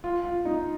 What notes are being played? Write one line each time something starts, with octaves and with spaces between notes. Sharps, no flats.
F4
F4
D#4